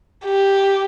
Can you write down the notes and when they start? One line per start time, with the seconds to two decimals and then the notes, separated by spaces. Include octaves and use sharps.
0.25 G4